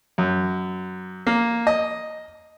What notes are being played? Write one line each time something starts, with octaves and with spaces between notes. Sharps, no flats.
F#2
A#3
D#5